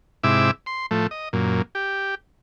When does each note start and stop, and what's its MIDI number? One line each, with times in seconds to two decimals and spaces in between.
0.24 0.51 44
0.24 0.51 48
0.24 0.51 64
0.24 0.51 76
0.24 0.51 86
0.66 0.86 84
0.91 1.07 45
0.91 1.07 53
0.91 1.07 57
1.11 1.29 75
1.33 1.62 42
1.33 1.62 46
1.75 2.15 67